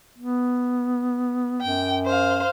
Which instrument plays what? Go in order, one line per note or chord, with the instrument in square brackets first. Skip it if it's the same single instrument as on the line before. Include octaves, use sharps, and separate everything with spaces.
[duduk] B3
[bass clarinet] F#2 [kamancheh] G5
[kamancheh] C5 F5